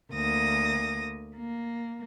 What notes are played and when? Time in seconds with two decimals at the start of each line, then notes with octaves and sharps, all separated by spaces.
0.12 D2 A#3 D#6 A#6
1.36 A#3